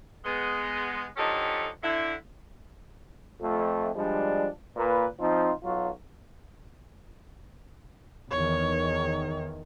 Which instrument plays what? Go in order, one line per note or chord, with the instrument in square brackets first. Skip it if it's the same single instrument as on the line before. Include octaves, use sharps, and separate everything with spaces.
[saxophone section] G#3 B3
D3 F3 C#4 D#4 G4 A4
D3 E4
[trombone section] F2 A3
F3 G3 G#3 D4
A#2 A#3 B4
F3 C4 D#4 F4
B1 F#3 F4 F#4
[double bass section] E2 D#3 [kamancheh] C#5